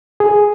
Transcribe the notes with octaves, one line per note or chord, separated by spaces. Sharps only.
G#4